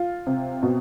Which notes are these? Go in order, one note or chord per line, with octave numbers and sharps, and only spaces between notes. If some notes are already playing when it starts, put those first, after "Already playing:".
Already playing: F4
C3
B2